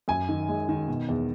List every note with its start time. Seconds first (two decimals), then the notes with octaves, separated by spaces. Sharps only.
0.08 F#2 G#5
0.29 D#3
0.48 G#3
0.69 D#3
0.88 B2
1.09 E2